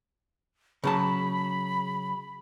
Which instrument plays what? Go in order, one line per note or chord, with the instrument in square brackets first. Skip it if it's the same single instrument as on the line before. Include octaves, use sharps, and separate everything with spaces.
[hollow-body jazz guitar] C#3 F#3 A5 [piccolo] B5